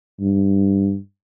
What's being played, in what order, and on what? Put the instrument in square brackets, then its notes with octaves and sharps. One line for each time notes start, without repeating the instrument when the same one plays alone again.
[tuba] G2